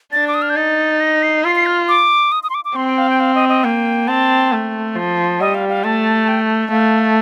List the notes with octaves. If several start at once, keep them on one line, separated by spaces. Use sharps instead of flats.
D4 A6
D6
D#6
F6
G6
D#4 A6
A#6
C7
F4 C7
C7
F6
D6
D#6
D#6
C6
D6
D6
C4 C6
G5
F5
G5
F5
D#5
D#5
A#3 G5
C4 A5
A3
F3
G3 D#5
F5
F5
A3 A5
G5
A3 F5